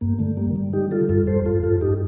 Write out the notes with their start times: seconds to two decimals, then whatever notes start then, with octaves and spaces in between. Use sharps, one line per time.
0.01 G2 A#3
0.19 D3 A3
0.37 G3 A#3
0.56 D3
0.73 G3 D#4 G4
0.91 G3 F4 A4
1.09 G2 F4 A4
1.27 G2 A4 C5
1.45 G2 F4 A4
1.63 G2 F4 A4
1.81 G2 D#4 G4